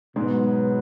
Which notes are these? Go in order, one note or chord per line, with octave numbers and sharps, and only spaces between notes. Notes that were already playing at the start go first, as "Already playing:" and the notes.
G#2 B2 F#3 G#3 B3